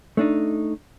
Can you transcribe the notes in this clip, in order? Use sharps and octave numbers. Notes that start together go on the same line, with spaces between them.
A3 D4 D#4